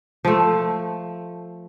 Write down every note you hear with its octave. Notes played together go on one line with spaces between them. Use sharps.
F3 A3